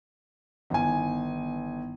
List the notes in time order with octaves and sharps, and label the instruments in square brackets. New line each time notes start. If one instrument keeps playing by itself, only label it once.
[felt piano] G1 G#5 [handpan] D#3 E3 B3